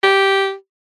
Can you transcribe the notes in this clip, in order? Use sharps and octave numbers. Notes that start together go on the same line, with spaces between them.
G4